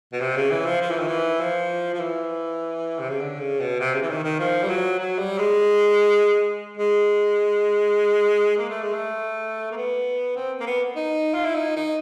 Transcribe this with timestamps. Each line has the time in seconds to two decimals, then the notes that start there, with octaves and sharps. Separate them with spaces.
0.13 B2
0.20 C3
0.36 C#3
0.51 E3
0.65 F3
0.81 F3
0.90 E3
0.99 D#3
1.07 E3
1.40 F3
1.94 F3
2.00 E3
2.99 C3
3.09 C#3
3.20 D3
3.39 C#3
3.60 B2
3.80 C3
3.94 C#3
4.02 E3
4.09 D#3
4.23 D#3
4.39 F3
4.63 G3
4.69 F#3
4.99 F#3
5.18 G3
5.38 G#3
6.77 G#3
8.57 A#3
8.69 A3
8.82 G#3
8.93 A3
9.71 A#3
9.76 B3
10.36 C4
10.60 A#3
10.66 B3
10.96 D#4
11.34 F4
11.45 E4
11.55 D#4
11.76 D#4